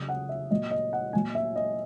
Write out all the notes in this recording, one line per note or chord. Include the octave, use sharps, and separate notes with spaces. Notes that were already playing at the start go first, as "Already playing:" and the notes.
Already playing: C#3 F#3 D#6
F#5
E5
A#2 F#3 D#5
D#5
F#5
A#2 F#3 G#5
E5
D#5